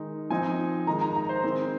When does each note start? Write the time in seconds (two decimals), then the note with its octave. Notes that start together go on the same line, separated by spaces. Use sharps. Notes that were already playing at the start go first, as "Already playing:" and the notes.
Already playing: D#3 G#3 D#4
0.30 F3 C4 D#4 G#5
0.87 D#3 G#3 D#4 A#5
1.01 A#5
1.16 A#5
1.29 C5
1.44 D#3 G#3 C4